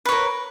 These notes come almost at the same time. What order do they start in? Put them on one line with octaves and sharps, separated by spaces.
B4 C#5 A#4